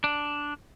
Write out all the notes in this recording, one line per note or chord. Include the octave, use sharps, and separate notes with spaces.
D4